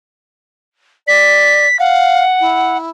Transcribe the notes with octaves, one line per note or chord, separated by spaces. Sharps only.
D5 B6
F5 F#5
E4